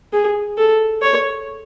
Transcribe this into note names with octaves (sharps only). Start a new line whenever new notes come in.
G#4
A4
C#5